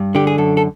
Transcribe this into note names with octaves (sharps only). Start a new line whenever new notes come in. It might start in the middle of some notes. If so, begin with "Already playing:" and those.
Already playing: G2
D3 G4
G#4
F#2 A4
A4